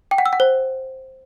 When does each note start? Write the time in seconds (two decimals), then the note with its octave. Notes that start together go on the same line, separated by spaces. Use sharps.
0.11 G5
0.18 F#5
0.26 E6
0.33 F#5
0.40 C5